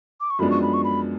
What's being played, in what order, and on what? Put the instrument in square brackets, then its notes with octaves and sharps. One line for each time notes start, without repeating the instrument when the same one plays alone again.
[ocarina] D6
C#6
[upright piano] F#2 F3 G#3 B3 D4 [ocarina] B5
[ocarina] C#6
B5
C#6
B5